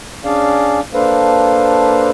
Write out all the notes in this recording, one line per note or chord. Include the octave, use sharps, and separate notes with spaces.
C#4 D4 G#4 D5 F5
A#3 D4 A4 B4 C5 F5